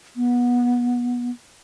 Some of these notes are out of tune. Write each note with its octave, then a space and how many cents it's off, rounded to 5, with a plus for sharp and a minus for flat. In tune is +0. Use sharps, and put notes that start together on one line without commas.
B3 -20